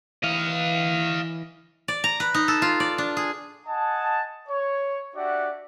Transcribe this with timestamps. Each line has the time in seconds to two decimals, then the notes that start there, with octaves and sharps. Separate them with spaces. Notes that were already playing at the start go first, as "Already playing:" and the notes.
0.24 E3 D#5 F5
1.88 D5
2.04 A#5
2.20 B4
2.34 D#4
2.48 A4
2.62 F4
2.80 D5
2.98 D4
3.17 G#4
3.67 D#5 F#5 G#5 A5
4.49 C#5
5.15 D4 F#4 G4 D5 E5 F#5